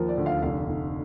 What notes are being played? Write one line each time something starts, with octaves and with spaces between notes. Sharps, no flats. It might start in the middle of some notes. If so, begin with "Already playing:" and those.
Already playing: D#2 F3 A#4
D5
D2
F5
F1 F5
F1